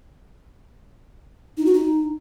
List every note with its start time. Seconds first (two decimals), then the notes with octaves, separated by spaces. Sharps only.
1.57 D#4
1.66 F#4
1.74 D#4